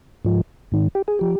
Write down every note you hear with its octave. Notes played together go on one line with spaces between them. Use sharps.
G#2 F3
G#2 D#3
G4
G#4
F3 G4